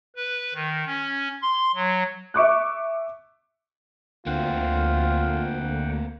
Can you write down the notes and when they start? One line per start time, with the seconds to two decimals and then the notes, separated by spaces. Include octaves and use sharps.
0.16 B4
0.55 D#3
0.86 C#4
1.42 C6
1.75 F#3
2.34 E5 C#6 D6 F#6
4.26 D2 A#3 C4 F4 F#5 G5